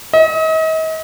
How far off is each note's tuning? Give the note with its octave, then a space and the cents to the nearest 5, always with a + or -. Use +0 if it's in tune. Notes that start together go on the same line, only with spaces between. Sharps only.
D#5 +40